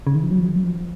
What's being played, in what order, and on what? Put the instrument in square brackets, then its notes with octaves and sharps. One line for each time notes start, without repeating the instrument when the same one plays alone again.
[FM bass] C#3
D#3
F3
F#3
F3
D#3
F#3
F3